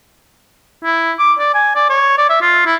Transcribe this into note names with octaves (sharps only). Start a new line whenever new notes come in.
E4
D6
D5
G#5
D5
C#5
D5
E5
F4
E4